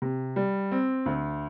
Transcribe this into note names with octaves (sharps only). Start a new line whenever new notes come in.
C3
G3
C4
D2